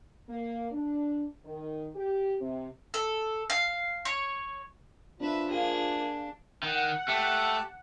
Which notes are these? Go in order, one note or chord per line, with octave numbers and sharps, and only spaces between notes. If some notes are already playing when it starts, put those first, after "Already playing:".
A#3
D4
D#3
G4
C3
A4
F5
C#5
F3 D4 B4 E5
A#3 D4 G4 G#4 F5
D#3 F#5
A3 G4 A5